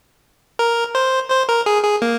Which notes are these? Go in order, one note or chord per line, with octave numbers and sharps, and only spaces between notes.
A#4
C5
C5
A#4
G#4
G#4
A#3